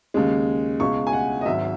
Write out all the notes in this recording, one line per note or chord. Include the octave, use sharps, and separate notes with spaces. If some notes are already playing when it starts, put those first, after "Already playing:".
D#2 C#3 G#3
C#2 B2 G#3 C#6
G#5
F#5
D#5
G#1 G#2 F#3 E5